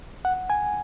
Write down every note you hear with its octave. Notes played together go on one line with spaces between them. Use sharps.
F#5
G#5